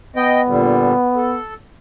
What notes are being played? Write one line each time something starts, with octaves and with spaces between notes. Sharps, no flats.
B3 D#5 G5
A#2 D3 G3
A4